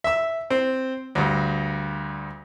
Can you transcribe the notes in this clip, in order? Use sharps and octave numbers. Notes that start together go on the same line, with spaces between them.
E5 E6
C4
D2 G2